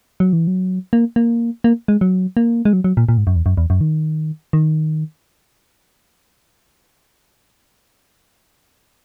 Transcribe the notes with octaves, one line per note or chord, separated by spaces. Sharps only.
F#3
E3
F#3
A#3
A#3
A#3
G#3
F#3
A#3
G#3
F#3
F#3
A#2
A#2
G#2
F#2
E2
F#2
E2
F#2
D#3
D#3